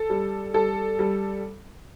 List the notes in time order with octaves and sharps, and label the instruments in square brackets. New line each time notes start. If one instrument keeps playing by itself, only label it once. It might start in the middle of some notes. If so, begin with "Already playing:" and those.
Already playing: [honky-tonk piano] A4
G3
G3 A4
G3